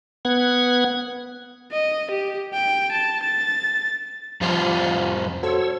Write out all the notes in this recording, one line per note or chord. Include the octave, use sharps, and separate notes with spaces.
B3 F#5 G#6
D#5
G4
G5
A5
A6
F2 F3 G3 F4
F#4 A4 C5 C#5 E6